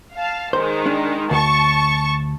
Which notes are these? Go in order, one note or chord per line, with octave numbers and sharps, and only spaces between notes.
F5 A5
D#3 G#3 C5
D4
D2 A5 C#6